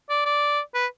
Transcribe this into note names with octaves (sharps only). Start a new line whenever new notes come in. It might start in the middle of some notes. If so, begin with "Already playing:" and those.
D5
D5
B4